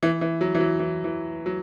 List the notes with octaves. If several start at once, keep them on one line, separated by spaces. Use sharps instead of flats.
E3
E3
F#3
E3
F#3
E3
E3
F#3